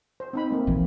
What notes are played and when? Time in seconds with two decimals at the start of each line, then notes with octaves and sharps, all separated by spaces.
0.20 C5
0.33 C4 D#4 B5
0.51 A3 A#3 C4
0.67 A#1 A#2 E3